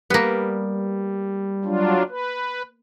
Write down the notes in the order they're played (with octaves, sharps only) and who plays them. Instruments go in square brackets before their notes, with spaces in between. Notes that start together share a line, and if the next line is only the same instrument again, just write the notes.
[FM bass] G3 [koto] A#3 B3
[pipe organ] F#3 D4 F4
B4